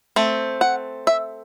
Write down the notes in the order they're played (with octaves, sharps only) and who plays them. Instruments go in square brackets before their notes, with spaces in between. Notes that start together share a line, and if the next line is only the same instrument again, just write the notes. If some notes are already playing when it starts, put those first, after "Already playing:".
[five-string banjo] A3 C4
F#5
E5